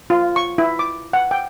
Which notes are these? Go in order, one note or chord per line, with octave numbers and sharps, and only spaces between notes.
F4
C#6
E4
D6
F#5
G5